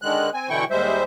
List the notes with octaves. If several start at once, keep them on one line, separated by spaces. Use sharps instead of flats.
D3 D#3 G#3 F#6
C4 G#5
B2 D3 E3 E4 G5 C#6
D#2 G3 G#3 C5 E5